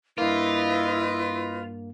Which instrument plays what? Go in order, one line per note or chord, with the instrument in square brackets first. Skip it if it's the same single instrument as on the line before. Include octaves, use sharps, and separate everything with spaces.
[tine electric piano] G2 A#3 [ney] E4 [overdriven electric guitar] F4 [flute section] B4 D#5